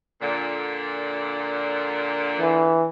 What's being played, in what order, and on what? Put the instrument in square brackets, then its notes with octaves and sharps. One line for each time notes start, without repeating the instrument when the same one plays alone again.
[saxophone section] A#2 D3
[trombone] E3